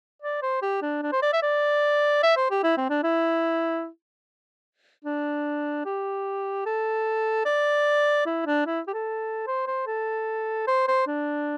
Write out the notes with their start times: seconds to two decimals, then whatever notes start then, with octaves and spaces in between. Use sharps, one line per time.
0.22 D5
0.42 C5
0.62 G4
0.82 D4
1.02 D4
1.12 C5
1.22 D5
1.33 E5
1.42 D5
2.23 E5
2.37 C5
2.50 G4
2.63 E4
2.77 C4
2.90 D4
3.03 E4
5.04 D4
5.85 G4
6.66 A4
7.45 D5
8.26 E4
8.46 D4
8.67 E4
8.88 G4
8.93 A4
9.47 C5
9.67 C5
9.87 A4
10.67 C5
10.88 C5
11.07 D4